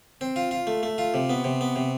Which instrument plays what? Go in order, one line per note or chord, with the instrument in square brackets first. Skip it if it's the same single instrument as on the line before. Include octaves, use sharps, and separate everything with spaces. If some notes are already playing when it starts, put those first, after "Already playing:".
[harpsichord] C4
F4
F4
A3
A3
F4
C3
B3
C3
B3
C3